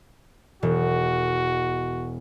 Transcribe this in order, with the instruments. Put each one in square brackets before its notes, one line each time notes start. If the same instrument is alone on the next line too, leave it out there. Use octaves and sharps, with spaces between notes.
[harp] E1 [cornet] F#4